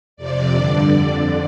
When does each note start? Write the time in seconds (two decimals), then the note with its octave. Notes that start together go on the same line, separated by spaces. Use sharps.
0.17 F2 C3 D5
0.54 G2 D3
0.91 F2
0.96 D3